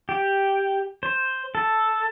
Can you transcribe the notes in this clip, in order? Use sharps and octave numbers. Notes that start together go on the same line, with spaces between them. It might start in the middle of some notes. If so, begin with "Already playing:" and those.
G4
C5
A4